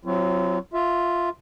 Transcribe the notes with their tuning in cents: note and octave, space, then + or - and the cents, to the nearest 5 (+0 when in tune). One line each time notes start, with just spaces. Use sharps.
F#3 +0 C4 +0 F4 -40
F4 +0 E5 +0